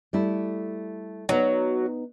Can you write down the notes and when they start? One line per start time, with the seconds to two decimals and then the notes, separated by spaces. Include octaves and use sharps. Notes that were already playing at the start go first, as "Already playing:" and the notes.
0.13 G3 A3 E4
1.29 F#3 B3 D#4